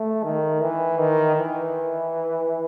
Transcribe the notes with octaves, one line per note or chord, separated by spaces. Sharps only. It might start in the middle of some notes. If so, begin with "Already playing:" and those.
Already playing: A3
D#3
E3
D#3
E3